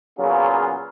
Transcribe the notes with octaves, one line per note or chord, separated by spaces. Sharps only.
A#2 C#3 F#3 B3 F4 G#4